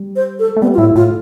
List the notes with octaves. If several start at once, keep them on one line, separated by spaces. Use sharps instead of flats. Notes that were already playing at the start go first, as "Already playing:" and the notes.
Already playing: G3
C5
A4
A3
G3 B3
F4
A2 E4
A2 F4